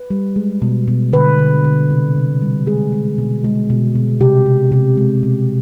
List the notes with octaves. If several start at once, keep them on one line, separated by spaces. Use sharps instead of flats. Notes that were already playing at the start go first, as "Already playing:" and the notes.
Already playing: B4
G3
G#3
B2
B2
D3 B4
D3
D3
C3
C3
G3
G#3 G#4
G#3
B2
G#3
B2
B2
C3 G4
C3
C3
G#3
B2